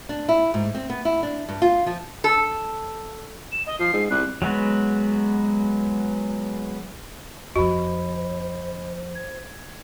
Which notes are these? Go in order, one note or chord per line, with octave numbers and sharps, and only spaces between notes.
D4
E4
G#2
C4
B3
E4
D4
G2
F4
F3
A4
E7
D#5
F3 C7
G#2
C2 F#6
F#3 G#3 B3 F#4
F2 F3 F#4 C5 D#5 B5
G#6